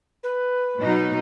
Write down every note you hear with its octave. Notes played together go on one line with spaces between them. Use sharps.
B4
B2 F#3 D#4